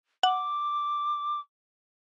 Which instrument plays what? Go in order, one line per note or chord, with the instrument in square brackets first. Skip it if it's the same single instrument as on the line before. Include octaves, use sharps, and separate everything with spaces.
[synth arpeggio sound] F#5 [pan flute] D6